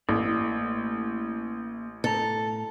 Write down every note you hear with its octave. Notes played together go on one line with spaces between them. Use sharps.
A1 A3 A#3 D5
A2 A4 A#5